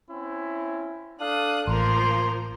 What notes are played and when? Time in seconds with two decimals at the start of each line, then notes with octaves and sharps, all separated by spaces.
0.10 C4 C#4 E4
1.20 D4 A4 F5 D#6 F#6
1.67 A1 F3 A#3 A#4 C6